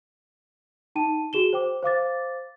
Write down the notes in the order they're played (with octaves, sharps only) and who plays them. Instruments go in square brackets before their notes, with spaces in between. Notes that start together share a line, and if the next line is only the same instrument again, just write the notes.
[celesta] D#4 G5 A5 D#7
F#4 G#4 E7 G7
C5 G5 D6
C5 F5 D6 A6